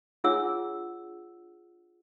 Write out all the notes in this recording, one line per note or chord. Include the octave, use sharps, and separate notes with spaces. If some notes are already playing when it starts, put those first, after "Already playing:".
D4 F4 G#4 C#5 F#5 E6